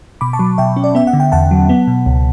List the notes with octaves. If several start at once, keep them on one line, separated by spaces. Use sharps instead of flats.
B2 B5 D6
A5 C#6
F#3
B2 E5 G5
C#4
D5
B3 E5
F#5
D3
G5
E2 F#5 A5
F#3
B3
B2
C#2